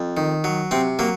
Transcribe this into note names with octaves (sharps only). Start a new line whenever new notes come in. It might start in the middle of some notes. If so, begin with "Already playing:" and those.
Already playing: F2
D#3
F#3
C3 C4
F#3 A#3